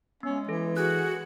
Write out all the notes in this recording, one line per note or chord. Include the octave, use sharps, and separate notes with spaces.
G#3 B3 C#4
E3 A4
F#4 G#4 F#6